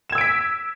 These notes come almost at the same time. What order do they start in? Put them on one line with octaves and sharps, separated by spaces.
E7 G#6 E6 D7 B6